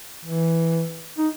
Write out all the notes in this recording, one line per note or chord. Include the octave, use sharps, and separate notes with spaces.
E3
D#4